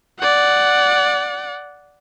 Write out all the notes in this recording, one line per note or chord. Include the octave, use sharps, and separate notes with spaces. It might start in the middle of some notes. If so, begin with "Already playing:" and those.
D5 F#5